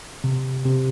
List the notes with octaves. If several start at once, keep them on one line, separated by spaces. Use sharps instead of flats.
C3
C3